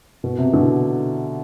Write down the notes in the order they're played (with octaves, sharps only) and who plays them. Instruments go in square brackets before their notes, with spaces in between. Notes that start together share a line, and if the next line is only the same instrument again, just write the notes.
[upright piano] B2
C3
B2 D3